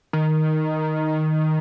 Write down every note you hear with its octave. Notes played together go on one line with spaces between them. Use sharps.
D#3